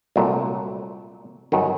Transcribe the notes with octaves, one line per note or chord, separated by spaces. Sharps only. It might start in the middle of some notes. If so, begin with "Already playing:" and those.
C2 A#2 F#3 A3
G1 F#2 D#3 F#3